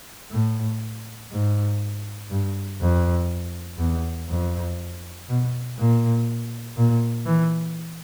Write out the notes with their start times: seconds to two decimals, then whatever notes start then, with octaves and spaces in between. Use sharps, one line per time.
0.31 A2
1.31 G#2
2.30 G2
2.80 F2
3.79 E2
4.29 F2
5.29 B2
5.78 A#2
6.77 A#2
7.26 E3